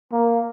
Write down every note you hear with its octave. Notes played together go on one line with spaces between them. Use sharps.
A#3